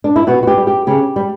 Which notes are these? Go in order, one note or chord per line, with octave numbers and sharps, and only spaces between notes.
D4
E4
B2 F#4
F#4
G4
G3
G4
C#3 G4
G3